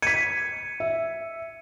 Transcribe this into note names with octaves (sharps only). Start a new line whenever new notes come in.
G#6 B6 C#7 D#7
E5